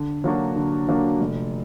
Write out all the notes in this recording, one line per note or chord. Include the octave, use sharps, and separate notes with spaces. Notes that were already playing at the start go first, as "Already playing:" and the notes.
Already playing: D3
F#3 A#3 D4 F#4
D3
F#3 A#3 D4 F#4
F1